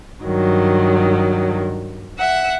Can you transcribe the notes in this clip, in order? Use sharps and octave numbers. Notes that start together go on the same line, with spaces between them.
G2 D#3 F#3
E5 F#5